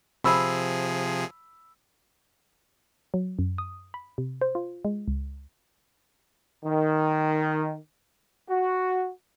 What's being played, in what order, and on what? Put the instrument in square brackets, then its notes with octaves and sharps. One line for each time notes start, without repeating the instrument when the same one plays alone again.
[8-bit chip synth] C3 F3 G#4 [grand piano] B5 E6
[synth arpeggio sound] F#3
F#2
D#6
B5
C3
C5
F4
G#3
C#2
[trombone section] D#3
F#4